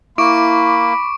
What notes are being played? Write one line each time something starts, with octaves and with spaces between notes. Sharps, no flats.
A#3 E4 B5 C#6 D6 D7